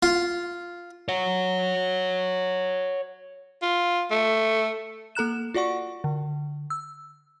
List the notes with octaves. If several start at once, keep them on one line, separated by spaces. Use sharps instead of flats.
F4
C#5 F#5
F4
A3
A#3 A4 A#5 F#6 E7
F4 F#4 D5 F#5 C#6
D3
E6